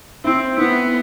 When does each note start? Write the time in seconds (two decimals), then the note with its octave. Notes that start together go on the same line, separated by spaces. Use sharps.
0.24 C4 E4
0.58 B3 E4